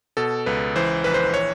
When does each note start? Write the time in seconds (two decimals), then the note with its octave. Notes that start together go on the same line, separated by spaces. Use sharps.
0.17 B2 A4
0.46 C#2 B4
0.76 E3 C5
1.04 A#1 B4
1.14 C5
1.34 C#5